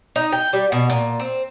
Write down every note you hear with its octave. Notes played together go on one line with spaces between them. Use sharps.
D#4
G5
G3
B2
A#2
C4